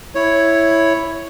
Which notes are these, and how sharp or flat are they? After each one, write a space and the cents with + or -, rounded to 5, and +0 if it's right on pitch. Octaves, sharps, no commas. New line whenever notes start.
E4 +0 C#5 +0